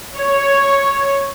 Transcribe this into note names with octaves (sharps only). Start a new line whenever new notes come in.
C#5